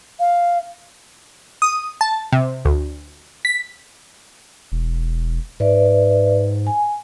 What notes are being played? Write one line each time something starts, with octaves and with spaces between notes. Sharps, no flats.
F5
D#6
A5
C3
D2
B6
E1
G#2 B4 D5 E5
G#5